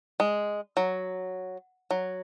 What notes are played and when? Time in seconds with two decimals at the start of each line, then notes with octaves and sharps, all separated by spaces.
0.20 G#3
0.77 F#3
1.91 F#3